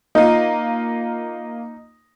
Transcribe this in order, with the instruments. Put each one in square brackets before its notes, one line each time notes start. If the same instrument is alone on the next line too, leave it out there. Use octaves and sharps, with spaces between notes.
[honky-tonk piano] A#3 F4 [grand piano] D#4